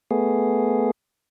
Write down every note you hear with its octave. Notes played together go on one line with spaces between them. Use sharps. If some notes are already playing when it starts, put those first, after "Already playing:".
A3 B3 G#4